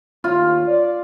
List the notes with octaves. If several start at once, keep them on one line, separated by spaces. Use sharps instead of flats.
D#2 F4 C#5
D5